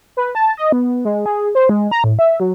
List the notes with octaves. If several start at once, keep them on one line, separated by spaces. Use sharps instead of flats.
B4
A5
D#5
B3
G#3
G#4
C5
G#3
A#5
A2
E5
F#3